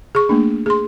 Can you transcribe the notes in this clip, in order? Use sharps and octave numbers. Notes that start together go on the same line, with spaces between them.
G#4 C#6
A3 A#3 D4
G#4 C6